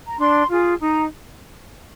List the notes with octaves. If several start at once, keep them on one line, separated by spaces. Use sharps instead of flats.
A#5
D4 C6
F4 G#4
D#4 A#5